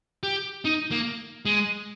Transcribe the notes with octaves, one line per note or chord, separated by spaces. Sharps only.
G4
D#4
A#3
G#3